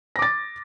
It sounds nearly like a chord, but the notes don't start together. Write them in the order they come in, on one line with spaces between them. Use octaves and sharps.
A#6 D6 A6